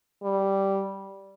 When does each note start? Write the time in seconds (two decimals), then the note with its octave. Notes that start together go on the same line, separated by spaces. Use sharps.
0.23 G3